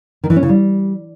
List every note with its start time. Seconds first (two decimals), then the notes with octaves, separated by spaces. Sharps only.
0.24 D#3
0.30 E3
0.36 C#4
0.43 C#3
0.49 G3